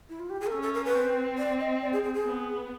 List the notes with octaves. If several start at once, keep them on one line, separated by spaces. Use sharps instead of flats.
E4
F4
G4
G#4
A#4
C#4 A4
A4
A#4
B4
C4
D5
D#5
D5
G#4
G#4
G#4
B3